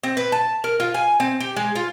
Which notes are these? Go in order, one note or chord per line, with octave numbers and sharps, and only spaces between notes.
C4
B4
A5
A#4
F4
G#5
C4
G4
G#3
F4